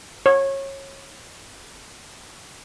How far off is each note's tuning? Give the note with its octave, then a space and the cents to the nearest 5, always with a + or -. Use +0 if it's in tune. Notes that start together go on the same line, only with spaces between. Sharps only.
C#5 -25